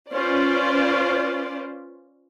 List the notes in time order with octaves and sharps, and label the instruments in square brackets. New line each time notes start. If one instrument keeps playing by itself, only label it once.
[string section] C#4 F4 B4 C5 D5